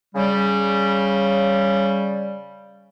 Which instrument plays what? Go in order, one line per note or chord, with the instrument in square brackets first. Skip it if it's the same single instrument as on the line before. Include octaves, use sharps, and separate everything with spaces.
[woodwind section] C#3 G3